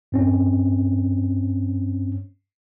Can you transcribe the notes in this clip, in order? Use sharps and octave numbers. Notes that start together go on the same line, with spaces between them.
G2 C4 C#4